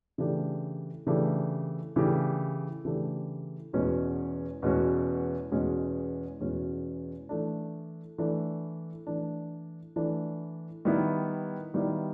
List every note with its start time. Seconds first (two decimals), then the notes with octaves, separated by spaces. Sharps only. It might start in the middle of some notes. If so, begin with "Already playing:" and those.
0.18 C#3 E3 A3 D4 G4
1.07 C#3 E3 A3 D4 G4
1.96 C#3 E3 A3 D4 G4
2.85 C#3 E3 A3 D4 G4
3.73 E2 B2 G#3 C#4 F#4
4.62 E2 B2 G#3 C#4 F#4
5.52 E2 B2 G#3 C#4 F#4
6.40 E2 B2 G#3 C#4 F#4
7.29 E3 A3 D4
8.18 E3 A3 D4
9.07 E3 A3 D4
9.96 E3 A3 D4
10.85 D#3 G3 B3 E4
11.74 D#3 G3 B3 E4